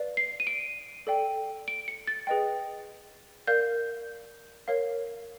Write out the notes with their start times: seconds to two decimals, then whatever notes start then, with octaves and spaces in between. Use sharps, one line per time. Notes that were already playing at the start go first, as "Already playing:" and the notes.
Already playing: B4 D5 F5
0.17 C7
0.40 D#7
0.47 D7
1.07 A4 D5 G5
1.68 D7
1.88 C#7
2.07 A6
2.27 G#4 B4 D#5 G5
3.47 A#4 D5 F5 G6
4.68 A#4 C#5 F5